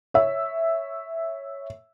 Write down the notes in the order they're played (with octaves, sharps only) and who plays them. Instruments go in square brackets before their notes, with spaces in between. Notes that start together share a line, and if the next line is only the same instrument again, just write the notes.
[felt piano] C#5 E5